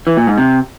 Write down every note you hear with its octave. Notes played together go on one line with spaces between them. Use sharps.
E3
A#2
G#2
C3